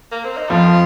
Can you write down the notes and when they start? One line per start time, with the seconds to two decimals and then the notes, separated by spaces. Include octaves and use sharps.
0.12 A#3
0.24 C4
0.37 D#4
0.49 F2 F3 F4